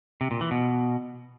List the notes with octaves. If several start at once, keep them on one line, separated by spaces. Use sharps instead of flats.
C3
A#2
E3
B2